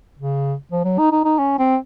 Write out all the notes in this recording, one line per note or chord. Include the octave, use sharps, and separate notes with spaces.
C#3
F3
F#3
D#4
D#4
D#4
C#4
C4